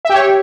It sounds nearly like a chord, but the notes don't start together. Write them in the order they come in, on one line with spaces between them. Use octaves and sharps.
E5 G4 C#5